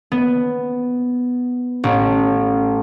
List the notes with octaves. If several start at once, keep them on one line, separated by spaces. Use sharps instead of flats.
B3
A1